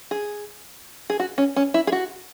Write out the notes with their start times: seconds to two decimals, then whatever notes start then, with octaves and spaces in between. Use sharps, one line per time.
0.11 G#4
1.10 G#4
1.19 F#4
1.38 C#4
1.56 C#4
1.74 E4
1.87 G#4
1.92 F#4